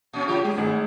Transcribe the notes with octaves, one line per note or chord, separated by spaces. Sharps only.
A#2 C#4 D#6
C3 F#3 F4 G4
G#3 G#4
G#1 A3